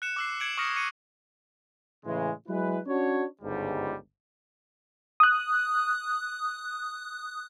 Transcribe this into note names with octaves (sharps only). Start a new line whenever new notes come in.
F#6 C#7 E7
D6 E6 C7
G#6 C#7 D7 F#7
C#6 D#6 F6 A#6 C#7
C#6 C#7 D#7
A2 C#3 E3 G#3
F#3 G#3 E4 B4
C#4 D4 F#4 C#5
G1 C#2 G#2 G3
D#6 F#6